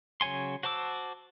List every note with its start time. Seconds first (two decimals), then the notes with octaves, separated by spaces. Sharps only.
0.21 C#3 F#3 C#5 G#5 C6
0.63 F#4 C5 A5 D6 E6